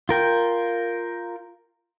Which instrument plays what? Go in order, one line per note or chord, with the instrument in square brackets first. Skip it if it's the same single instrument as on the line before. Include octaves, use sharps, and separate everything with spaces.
[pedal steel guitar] F4 A#4 G5